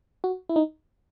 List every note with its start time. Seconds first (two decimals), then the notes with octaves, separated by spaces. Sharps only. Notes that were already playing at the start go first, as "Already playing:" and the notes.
0.24 F#4
0.49 E4
0.56 D#4